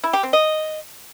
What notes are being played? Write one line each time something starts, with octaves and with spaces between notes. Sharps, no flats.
E4
G4
C4
D#5